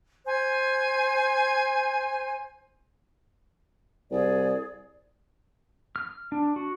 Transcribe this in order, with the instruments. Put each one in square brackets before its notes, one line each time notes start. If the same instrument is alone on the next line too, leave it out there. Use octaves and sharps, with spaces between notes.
[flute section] C5 G#5
[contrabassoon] C2 [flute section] G#4 D5
[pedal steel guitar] F6
D4
F#4